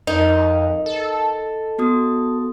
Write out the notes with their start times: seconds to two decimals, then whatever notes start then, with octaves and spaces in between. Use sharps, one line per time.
0.07 F2 D#4 A#4
0.86 A4
1.78 B3 F#4 D#6